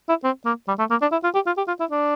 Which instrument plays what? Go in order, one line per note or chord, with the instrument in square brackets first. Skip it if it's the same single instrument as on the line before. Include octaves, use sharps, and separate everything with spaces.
[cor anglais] E4
C4
A#3
G3
A3
A#3
D4
E4
F4
G4
F4
G4
F4
E4
D4